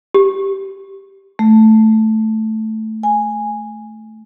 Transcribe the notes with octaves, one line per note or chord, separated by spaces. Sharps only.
G4
A3
G#5